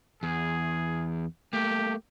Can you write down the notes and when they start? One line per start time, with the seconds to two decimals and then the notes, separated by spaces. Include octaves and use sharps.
0.23 E2 G#4
1.53 A3 A#3 G4